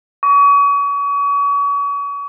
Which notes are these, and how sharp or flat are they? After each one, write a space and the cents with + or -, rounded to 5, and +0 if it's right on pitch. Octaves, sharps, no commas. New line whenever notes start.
C#6 +40